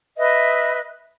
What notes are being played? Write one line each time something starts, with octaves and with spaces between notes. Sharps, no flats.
B4 D#5 E5